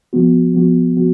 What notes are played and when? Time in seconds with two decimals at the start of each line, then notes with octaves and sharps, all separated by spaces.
0.13 F3 B3 F#4
0.54 F3 B3 F#4
0.96 F3 B3 F#4